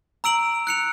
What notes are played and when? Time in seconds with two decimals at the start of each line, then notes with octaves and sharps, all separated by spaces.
0.24 A#5 E6 D7 F#7
0.67 F#6 C#7 F7